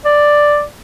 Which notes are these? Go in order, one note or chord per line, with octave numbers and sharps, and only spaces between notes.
D5